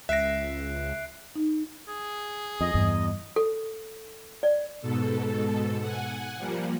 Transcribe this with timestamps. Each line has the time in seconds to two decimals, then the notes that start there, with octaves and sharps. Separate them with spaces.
0.09 C#2 E5 F#6 A#6 C7 D7
1.35 D#4
1.88 G#4
2.61 F2 D#5
2.74 E2 G2
3.36 A4
4.43 D5
4.82 G#2 B2 A4
5.81 F#5 G#5
6.37 F3 G3 A#3